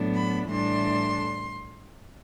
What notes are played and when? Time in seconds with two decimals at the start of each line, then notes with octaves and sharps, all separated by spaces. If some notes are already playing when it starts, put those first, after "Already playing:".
Already playing: A2 F#3 B3 D4
0.13 B5
0.49 A2 E3 G3 D4 C6